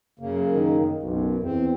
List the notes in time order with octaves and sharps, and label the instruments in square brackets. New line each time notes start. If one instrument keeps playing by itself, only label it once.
[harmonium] F#2 C#3 A#3
[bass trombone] D#3
[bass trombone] B1 [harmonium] F#2
[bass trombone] E2 [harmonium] C4